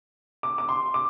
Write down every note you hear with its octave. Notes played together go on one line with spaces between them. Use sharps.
D6
D6
C6
D6